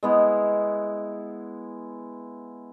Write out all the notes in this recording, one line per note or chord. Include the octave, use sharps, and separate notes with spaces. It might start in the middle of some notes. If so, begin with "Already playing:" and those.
G#3 B3 E4